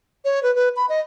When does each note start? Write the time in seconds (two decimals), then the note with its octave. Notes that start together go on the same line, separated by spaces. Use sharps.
0.25 C#5
0.43 B4
0.55 B4
0.76 B5
0.89 D#5